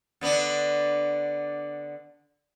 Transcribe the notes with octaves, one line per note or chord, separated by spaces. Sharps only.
D3 B3 D4